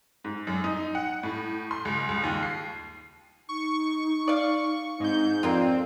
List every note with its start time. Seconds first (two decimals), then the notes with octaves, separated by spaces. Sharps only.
0.24 G#2
0.47 F#2
0.64 D#4
0.95 F#5
1.23 A2
1.71 C6
1.85 C#2
2.09 C#2
2.23 D#2
2.43 C7
3.49 D#4 C#6
4.28 D5 F5
5.00 G#2 C4 D#4 G6
5.43 F2 A#3 C4 F4 D5